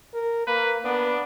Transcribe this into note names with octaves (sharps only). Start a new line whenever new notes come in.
A#4
A#3 B4
B3 D4